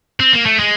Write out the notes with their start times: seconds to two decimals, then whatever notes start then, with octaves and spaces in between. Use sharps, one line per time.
0.20 C4
0.33 A#3
0.46 A3
0.60 G#3